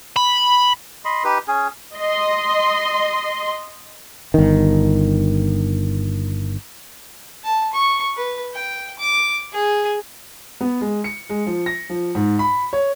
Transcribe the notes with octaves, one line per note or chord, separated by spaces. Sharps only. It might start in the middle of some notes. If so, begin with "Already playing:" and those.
B5
D#5 B5 C6
D#4 G4 B4
C#4 G#4
D#5 C6
G1 D#3
A5
C#6
B4
G5
D6
G#4
B3
G#3
C#7
G#3
F3
A#6
F3
G#2
B5
C#5